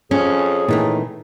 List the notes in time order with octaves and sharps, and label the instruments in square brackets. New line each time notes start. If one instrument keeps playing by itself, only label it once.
[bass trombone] F2 [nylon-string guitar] C#4 [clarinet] G#4
[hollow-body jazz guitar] A#2 E3 A3 [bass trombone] D#3